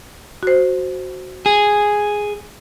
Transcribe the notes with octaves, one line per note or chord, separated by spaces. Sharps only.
F#4 C5
G#4